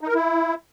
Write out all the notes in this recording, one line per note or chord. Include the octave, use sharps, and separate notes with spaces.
D#4
A#4
E4